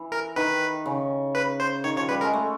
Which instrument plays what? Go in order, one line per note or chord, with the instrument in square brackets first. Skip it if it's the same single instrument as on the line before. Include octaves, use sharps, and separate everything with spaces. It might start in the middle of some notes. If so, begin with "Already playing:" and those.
Already playing: [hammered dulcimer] E3
[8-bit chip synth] A#4
[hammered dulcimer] D#3 [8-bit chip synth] B4
[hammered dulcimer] C#3
[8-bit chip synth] B4
C5
[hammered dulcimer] D#3 [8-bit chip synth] C#5
[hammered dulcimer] F3 [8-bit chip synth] C#5
[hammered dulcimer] G3 [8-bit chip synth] B4
[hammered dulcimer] G#3 [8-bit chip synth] A#4
[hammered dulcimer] A3